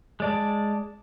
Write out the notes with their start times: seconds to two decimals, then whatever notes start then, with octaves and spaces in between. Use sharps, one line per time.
0.20 G#3 D5 A5